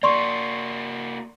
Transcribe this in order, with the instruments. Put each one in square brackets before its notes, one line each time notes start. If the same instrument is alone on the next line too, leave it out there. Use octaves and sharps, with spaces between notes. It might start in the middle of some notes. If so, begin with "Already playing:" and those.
[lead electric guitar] A#3 F#4 [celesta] D5 C6 C#6